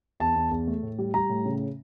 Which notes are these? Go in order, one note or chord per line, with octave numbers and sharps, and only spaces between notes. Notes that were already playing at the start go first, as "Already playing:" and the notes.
E2 A5
E2
E2
A3
A2
G3
G3 A#5
A2
C#3